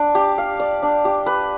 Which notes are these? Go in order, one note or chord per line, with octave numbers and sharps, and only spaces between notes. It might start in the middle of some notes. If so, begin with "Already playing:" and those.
Already playing: D4 D5
G4
F5
D5
D4
G4
B4